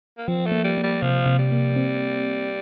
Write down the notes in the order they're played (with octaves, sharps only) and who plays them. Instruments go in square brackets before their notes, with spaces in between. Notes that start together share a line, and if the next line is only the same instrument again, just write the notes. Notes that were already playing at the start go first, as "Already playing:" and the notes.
[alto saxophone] A#3
[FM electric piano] F3 [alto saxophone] C4
[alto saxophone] A3
[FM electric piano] A#3
[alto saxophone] G3
[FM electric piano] A#3
[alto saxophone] G3
[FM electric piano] C3 [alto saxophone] F3
[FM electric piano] C3
[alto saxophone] G3
[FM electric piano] A#3
C4